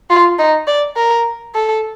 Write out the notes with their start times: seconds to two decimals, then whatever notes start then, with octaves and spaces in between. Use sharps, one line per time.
0.10 F4
0.38 D#4
0.67 D5
0.97 A#4
1.55 A4